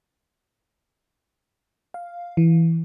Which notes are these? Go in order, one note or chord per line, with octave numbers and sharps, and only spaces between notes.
F5
E3